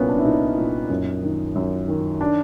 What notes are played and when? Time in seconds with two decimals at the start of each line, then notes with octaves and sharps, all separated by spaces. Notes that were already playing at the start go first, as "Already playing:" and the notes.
Already playing: C2 A#2 A#3 B3 C#4
0.09 D4
0.18 E4
0.24 C2 D#4
0.57 A#2
0.90 F#2
1.23 D#3
1.55 F#2
1.88 D#3
2.21 D4